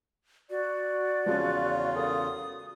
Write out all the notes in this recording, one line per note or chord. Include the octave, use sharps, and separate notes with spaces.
F#4 D5
E2 C#3 F3 G#3 C#4 F4
C#4 A4 A#4 D#6